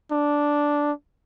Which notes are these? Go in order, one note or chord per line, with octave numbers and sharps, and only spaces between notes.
D4